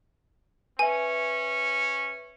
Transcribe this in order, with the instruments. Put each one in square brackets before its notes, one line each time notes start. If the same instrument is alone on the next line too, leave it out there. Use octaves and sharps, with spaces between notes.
[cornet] C#4 [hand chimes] B4 E5 [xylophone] G#5